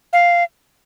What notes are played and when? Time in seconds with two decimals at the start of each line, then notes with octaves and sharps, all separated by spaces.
0.13 F5